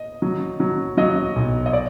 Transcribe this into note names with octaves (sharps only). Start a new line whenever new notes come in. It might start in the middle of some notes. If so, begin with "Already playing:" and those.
Already playing: D#5
F#3
F#3
F#3 D#5
B1
D#5
D5